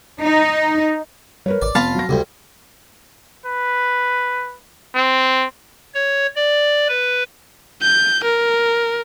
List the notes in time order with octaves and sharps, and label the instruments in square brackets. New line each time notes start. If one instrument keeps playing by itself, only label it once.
[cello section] D#4
[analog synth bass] G3 [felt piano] A#4 B4 C#5
[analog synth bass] A1 [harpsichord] D5
[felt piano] F1 [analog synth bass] B3 [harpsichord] F4 [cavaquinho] F5 A5 B5
[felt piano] F#3 A#6
[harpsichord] D2 G2 [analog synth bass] C#3
[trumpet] B4
C4
[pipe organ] C#5
D5
B4
[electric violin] G6
A#4